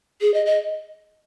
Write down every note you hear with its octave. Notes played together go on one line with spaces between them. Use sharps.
G#4
D#5
D#5